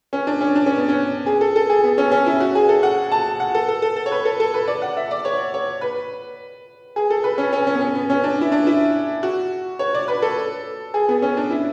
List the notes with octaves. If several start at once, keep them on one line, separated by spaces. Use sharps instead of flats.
C#4
D4
C#4
D4
C#4
B3
C#4
G#4
A4
A4
G#4
B3
C#4
C#4
E4
F#4
G#4
A4
F#5
A5
F#5
A4
A4
A4
A4
C#5
B4
A4
A4
B4
D5
F#5
E5
D5
C#5
C#5
B4
G#4
A4
B4
C#4
C#4
C#4
B3
C#4
B3
C#4
D4
E4
D4
E4
F#4
C#5
D5
B4
A4
G#4
B3
C#4
D4
E4